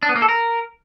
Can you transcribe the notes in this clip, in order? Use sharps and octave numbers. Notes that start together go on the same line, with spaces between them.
D4
B3
A#3
A4
A#4